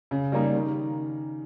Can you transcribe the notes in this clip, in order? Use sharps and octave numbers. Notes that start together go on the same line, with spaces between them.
C#3
G3 A#3 D#4
D#3